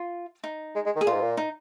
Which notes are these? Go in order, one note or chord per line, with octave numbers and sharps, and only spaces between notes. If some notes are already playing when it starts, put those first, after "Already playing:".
Already playing: F4
D#4
G#3
G#3
D#3
G#4
A#2 F4
G#2
A#2
D#4